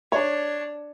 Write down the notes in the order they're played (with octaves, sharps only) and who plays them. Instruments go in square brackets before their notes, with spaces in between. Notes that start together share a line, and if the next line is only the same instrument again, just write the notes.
[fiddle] D4 [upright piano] C#5